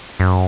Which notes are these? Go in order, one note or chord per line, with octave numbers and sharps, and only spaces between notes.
F#2